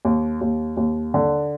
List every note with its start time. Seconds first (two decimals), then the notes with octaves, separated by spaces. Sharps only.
0.05 D#2
0.41 D#2
0.77 D#2
1.14 D3